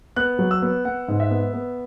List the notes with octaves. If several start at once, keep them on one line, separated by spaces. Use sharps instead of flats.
B3 F#6
F#3
E6
B3
B3 F#5
G#2
E5
B3
B3